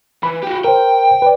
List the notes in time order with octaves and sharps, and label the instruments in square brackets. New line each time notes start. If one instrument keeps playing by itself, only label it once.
[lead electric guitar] E3 [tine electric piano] B5
[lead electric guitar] F#4 G4
[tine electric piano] A#4 C5 [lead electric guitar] G5
[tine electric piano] B4 D5